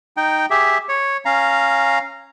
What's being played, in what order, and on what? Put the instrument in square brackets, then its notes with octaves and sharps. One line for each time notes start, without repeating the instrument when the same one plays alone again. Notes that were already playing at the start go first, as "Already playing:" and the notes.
[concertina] D#4 G5
G4 G#4 E5
C#5
C#4 F5 A#5